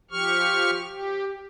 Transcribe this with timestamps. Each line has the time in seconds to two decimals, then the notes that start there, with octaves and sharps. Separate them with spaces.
0.11 F3 G4 C#6 F6
0.89 G4